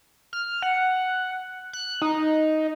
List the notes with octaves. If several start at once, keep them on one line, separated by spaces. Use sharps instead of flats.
F6
F#5
F#6
D#4